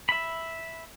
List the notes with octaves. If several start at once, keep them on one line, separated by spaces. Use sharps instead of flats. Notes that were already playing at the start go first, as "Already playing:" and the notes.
E5 B5